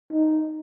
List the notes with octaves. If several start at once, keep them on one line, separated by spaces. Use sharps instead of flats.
D#4